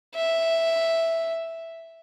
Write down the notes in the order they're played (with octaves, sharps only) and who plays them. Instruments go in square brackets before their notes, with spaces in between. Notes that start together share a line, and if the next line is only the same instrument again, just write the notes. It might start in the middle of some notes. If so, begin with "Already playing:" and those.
[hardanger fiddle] E5